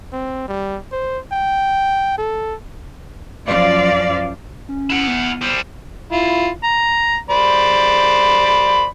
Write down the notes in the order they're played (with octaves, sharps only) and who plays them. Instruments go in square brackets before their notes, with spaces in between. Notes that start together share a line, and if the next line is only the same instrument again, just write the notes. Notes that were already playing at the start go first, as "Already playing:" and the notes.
[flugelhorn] C4
G3
C5
G5
A4
[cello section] F#2 F3 D5 F5
[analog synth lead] C#4
[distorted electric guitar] E4 F#5
[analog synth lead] B3
[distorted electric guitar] G3 C5
[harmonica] E4 F4
A#5
C5 D5 B5